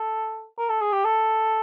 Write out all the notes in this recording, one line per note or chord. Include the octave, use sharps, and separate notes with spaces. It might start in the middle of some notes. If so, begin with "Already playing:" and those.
Already playing: A4
A#4
A4
G#4
G4
A4